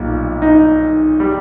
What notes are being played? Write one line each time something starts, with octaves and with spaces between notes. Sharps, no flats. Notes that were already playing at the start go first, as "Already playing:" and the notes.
Already playing: B1 A#2 G3
D#4
G3